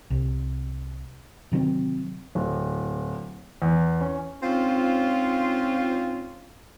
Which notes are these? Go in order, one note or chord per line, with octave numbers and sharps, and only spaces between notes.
C2
C3 D#3 F#3 C4
D1
E2
C#4
G#2 C4 C#4 F4